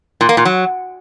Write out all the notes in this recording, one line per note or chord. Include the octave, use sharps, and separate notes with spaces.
A#2
A#3
A#2
F#3